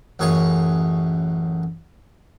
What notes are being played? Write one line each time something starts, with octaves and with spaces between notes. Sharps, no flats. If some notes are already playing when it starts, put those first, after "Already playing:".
A1 F#2 G#4 C#5 C#6